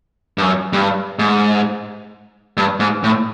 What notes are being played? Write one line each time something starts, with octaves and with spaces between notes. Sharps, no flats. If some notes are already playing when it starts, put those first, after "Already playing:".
G2
F#2
G2
G#2
G2
G#2
A2